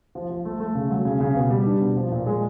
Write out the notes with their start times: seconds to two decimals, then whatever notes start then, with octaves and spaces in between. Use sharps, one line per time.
0.15 F3
0.30 F3
0.45 A3
0.60 A3
0.75 C#3
0.90 F#3
1.05 C#3
1.20 C#3
1.36 B2
1.51 G3
1.66 D4
1.81 B2
1.96 F3
2.12 A#2
2.26 G#3